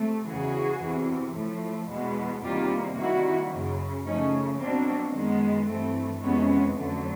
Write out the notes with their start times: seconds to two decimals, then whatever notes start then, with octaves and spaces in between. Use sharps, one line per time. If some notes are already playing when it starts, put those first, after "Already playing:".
Already playing: C3 A3
0.26 E2 C#3 E3 F#4 G#4
0.81 E2 C3 E3
1.35 A2 F3 A3
1.89 E2 B2 G#3 B3
2.43 E2 C3 D#3 G3 A#3 F4 G4
2.97 C3 D#3 G3 A#3 E4 F#4
3.52 F#2 C#3 F#3
4.05 C#3 F3 A3 C#4 D#4
4.60 B2 F#3 A#3 C4 D4
5.14 F#2 D#3 G#3 B3
5.68 G2 E3 A3 C4
6.23 F2 C3 E3 G#3 B3 C#4
6.77 F2 D3 F#3 A3